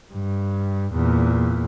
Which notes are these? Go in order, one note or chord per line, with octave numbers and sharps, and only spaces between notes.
G2
E2 A#2